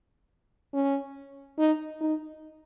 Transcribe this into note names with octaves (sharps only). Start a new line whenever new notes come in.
C#4
D#4
D#4